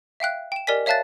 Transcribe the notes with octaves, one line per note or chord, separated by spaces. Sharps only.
E5 F5 G5 F#6
G5 E7
G4 A#4 D5 D#5 G#5 B6
C#5 E5 F5 A5 F#6 A6